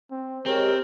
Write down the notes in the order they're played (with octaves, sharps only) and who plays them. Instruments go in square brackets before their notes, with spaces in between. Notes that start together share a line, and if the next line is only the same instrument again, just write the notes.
[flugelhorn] C4
[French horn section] G#3 G4 [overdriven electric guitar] C4 [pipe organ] A#4 [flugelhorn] C#5